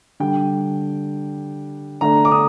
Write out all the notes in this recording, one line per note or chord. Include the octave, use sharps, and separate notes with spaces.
D3 G3 D4 G5
D3 A3 D4 A#5
D6
D#6